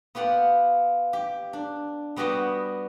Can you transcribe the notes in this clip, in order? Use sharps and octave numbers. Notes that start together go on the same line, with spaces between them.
B3 F4 G4 F#5
G4
D4
G3 B3 F#4 G4 D#5 F#5